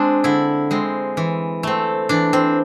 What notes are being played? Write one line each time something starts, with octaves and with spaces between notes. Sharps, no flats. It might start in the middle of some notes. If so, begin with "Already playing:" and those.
Already playing: G#3 C4 D4
D3 E4
G#3 C4
E3
A3 C4
E3 D4
C4